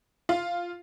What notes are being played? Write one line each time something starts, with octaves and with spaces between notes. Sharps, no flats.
F4